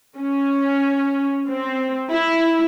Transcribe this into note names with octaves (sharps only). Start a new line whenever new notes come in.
C#4
C4
E4